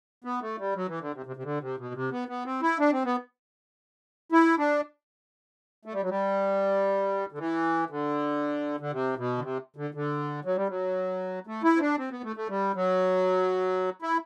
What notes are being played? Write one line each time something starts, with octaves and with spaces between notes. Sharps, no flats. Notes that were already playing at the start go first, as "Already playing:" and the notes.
B3
A3
G3
F#3
E3
D3
C3
C3
C3
D3
C3
B2
C3
B3
B3
C4
E4
D4
C4
B3
E4
D4
A3
G3
F#3
G3
D3
E3
D3
D3
C3
B2
D3
C3
D3
D3
F#3
G3
F#3
A3
E4
C4
D4
C4
B3
A3
A3
G3
F#3
E4